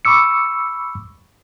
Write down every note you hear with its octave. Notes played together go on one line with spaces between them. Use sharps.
B5 C#6 D6 E6 C#7